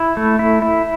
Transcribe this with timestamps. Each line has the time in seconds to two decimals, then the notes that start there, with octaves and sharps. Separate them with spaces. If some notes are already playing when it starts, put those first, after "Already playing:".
Already playing: E4
0.17 A3
0.39 E4
0.62 E4